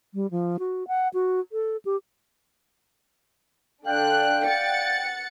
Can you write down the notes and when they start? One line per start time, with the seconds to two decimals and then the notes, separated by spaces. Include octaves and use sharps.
0.14 G3
0.31 F3
0.59 F#4
0.88 F#5
1.14 F#4
1.52 A4
1.85 G4
3.86 D3 D4 D5 F5 G5 F#6
4.45 F#5 A6 C#7